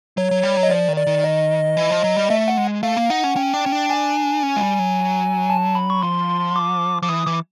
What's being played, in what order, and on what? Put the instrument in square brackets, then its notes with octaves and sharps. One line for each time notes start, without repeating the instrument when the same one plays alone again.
[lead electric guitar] F#3 [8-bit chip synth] C#5
[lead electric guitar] F#3
G3
F#3
[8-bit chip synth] D#5
[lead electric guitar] F3 [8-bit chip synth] D5
[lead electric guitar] D#3
[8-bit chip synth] D5
[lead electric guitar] D#3
[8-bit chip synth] D#5
[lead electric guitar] E3
F3
F#3
G3
[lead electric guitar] A3 [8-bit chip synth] E5
[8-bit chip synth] F#5
[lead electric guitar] G#3
[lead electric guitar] A3 [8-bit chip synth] F5
[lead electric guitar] A#3
[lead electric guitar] D#4 [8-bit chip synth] F#5
[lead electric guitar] C#4
[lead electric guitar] C#4 [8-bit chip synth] G5
[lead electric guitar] D4
C#4
D4
[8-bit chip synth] G#5
[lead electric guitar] C#4
G#3
G3
F#3
[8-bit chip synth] A5
B5
C#6
[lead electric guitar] F3 [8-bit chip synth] C6
[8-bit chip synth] D6
[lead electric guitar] F3 [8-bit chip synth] D6
[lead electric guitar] E3 [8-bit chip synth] D#6
[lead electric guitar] E3 [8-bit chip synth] D6